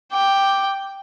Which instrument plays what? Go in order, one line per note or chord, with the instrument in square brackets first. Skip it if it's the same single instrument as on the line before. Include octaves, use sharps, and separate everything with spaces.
[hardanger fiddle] G5 [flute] D6